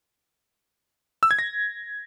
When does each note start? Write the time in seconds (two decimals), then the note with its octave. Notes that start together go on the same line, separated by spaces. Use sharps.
1.23 E6
1.31 G#6
1.39 A#6